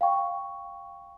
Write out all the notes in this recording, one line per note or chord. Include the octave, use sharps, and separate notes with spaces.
F5 G5 C#6